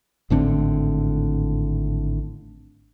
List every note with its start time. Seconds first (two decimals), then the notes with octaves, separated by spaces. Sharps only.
0.30 G#1 A2 D3 C4